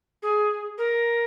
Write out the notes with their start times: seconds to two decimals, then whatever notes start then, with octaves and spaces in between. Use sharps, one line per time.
0.22 G#4
0.78 A#4